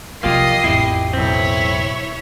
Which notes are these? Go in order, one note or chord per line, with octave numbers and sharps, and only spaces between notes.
C2 F3 A#3 F4 G4 D#5 C7
A1 F2 E4 G4
B1 C4 E4 C#5